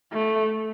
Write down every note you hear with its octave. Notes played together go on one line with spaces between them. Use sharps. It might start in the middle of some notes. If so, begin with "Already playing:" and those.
A3